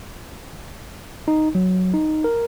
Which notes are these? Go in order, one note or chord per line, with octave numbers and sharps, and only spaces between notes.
D#4
F#3
D#4
A#4